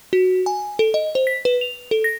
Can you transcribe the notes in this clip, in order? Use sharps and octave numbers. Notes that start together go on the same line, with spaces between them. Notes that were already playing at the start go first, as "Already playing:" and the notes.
F#4
G#5
A4
D#5
C5
B6
B4
F7
A4
A#6